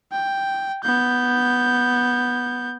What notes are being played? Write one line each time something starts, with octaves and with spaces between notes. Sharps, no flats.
G5
B3 G6